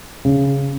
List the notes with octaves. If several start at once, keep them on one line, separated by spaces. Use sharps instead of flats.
C#3